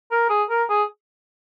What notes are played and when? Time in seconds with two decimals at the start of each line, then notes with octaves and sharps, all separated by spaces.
0.11 A#4
0.30 G#4
0.50 A#4
0.70 G#4